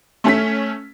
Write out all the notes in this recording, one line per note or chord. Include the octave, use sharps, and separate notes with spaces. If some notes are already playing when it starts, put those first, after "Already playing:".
A3 C#4 B6